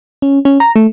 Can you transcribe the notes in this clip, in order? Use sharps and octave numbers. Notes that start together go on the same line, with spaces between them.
C#4
C#4
A#5
A3